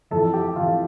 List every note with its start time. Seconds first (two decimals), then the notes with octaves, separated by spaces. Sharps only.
0.11 F2 E3 A4 A5
0.33 G4 G5
0.56 F2 E3 F4 F5